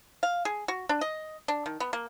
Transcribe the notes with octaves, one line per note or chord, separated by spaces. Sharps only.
F5
G#4
F#4
D4
D#5
D4
D#3
B3
A#3